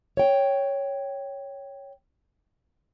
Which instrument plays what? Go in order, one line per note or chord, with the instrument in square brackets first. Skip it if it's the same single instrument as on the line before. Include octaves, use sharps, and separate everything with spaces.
[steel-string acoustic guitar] C#5 G5